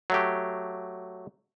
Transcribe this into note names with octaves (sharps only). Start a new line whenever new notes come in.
F#3 A3 G4